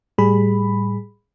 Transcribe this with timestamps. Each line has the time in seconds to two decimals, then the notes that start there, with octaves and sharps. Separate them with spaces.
0.18 A2 G3 G#4 B5